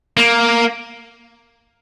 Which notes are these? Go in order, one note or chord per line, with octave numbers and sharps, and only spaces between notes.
A#3